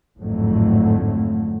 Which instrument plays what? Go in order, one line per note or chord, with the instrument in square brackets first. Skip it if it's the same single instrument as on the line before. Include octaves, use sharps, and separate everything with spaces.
[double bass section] G#1 F2 A2 D3 F#3 A3